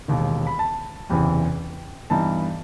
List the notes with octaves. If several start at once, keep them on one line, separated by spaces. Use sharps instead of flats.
E1 D#2 D#3
B5
A5
F#1 E2 C3 E3 G5
G2 E3 B3 D#4 A5